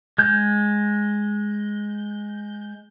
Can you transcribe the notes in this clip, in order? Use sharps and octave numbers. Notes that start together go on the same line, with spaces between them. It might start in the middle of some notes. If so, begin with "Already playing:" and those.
G#3 G6